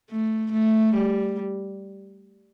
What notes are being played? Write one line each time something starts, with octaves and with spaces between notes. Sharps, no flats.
A3
A3
G3